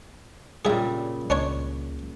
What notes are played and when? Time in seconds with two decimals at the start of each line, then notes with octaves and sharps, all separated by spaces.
0.65 A#2 C#3 G3 G#4 E5
1.30 C#2 C#4 D4 C#5